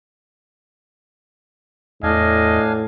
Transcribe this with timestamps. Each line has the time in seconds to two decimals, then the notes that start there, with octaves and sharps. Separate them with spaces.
2.03 E2 A2 D4 D#5 F5 G#5